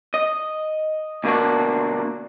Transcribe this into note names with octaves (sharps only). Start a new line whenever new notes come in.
D#5
D2 B2 A#3 C4 D4 F#4